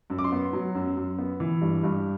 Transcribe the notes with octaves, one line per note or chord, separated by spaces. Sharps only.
F#2
D6
C6
B3
F#3
F#2
F#2
B3
E3
G2
G2